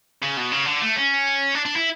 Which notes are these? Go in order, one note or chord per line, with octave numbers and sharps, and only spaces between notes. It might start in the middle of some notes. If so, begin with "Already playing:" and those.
C#3
B2
C#3
D3
A3
C#4
D4
D4
E4